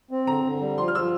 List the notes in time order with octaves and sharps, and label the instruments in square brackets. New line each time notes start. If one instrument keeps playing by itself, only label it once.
[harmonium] C4
[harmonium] D3 [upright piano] A#5
[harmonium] D3
G3
[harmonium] F3 [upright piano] C6
[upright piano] F6
[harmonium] F3 [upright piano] E6